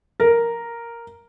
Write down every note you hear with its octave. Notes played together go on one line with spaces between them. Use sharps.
A#4